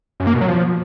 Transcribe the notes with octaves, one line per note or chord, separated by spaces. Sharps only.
F#2
A#3
B2
F#3
F3